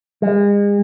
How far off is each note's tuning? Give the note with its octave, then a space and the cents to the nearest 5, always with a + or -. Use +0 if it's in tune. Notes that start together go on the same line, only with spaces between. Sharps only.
G#3 -40